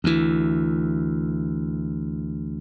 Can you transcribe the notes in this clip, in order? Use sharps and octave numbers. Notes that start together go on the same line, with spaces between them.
D2 E3